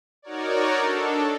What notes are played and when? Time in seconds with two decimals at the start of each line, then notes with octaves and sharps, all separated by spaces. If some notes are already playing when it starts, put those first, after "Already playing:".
0.22 D#4 F#4 A#4 C#5 D5
0.75 D4 A4